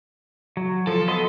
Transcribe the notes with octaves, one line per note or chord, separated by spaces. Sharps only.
F#3
F3 A4
B3 D#5 C6